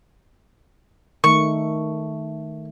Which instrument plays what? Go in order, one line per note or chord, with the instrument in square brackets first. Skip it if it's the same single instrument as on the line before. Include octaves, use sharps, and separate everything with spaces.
[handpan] D#3 A3 [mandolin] C#6